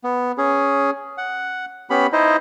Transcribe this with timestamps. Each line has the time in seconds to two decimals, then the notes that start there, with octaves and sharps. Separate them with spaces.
0.04 B3
0.38 C#4 G#4
1.18 F#5
1.90 B3 C#4 G4 B5
2.13 D#4 E4 C5 D#5